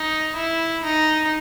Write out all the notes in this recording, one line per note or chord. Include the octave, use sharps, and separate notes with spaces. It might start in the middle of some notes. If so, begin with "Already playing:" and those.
Already playing: D#4
E4
D#4